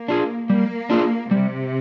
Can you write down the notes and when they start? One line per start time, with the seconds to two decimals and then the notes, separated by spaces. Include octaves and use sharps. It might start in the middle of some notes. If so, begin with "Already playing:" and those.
Already playing: A#3
0.08 D4 F4 G#4
0.49 G3 A#3
0.90 D4 F4 G#4
1.31 C3 G3